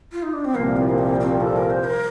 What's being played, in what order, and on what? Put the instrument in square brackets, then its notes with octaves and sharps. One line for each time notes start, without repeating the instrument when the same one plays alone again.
[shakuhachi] F4
D#4
D4
C4
[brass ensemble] C2 A#2 F3 [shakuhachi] A#3
[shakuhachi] C4
A#3
C4
C4
A4
A#4
C5
A#4